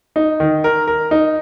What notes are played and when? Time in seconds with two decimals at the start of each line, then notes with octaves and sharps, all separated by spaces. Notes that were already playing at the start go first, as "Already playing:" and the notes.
0.16 D#4
0.40 D#3
0.64 A#4
0.87 A#4
1.11 D#4